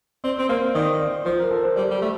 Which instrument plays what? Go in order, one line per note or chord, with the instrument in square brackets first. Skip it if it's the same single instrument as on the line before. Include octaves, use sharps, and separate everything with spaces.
[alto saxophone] C4 [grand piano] D5
[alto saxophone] C4
[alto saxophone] A#3 [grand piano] C5
[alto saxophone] D#3 [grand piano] D5
[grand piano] D5
[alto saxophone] F3 [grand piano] C5
[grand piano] A#4
A4
C5
[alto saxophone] G3 [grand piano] D5
[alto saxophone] G3
A3